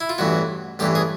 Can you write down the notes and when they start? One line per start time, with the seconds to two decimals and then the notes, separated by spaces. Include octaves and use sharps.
0.01 E4
0.09 F4
0.18 A1 G2 E3 F#4
0.79 A1 G2 E3 G4
0.95 G#4